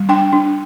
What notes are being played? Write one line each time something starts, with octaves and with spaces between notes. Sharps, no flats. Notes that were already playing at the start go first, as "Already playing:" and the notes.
Already playing: G3
D4 G5
D4